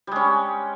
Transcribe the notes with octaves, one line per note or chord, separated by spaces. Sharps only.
G3 G#3 C#4